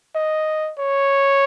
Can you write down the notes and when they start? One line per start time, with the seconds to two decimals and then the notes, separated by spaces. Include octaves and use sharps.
0.15 D#5
0.78 C#5